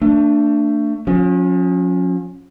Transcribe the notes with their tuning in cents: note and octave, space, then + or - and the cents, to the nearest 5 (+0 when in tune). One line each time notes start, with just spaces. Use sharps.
A3 +30 D4 +0
F3 +45 C#4 +0